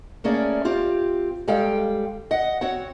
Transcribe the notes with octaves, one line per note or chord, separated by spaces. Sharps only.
A3 A#3 C#4 G#4 D5
C4 F4 G4
G3 G#3 A4 F5 G5
D#5 F#5
C4 F#4 C#5 F#5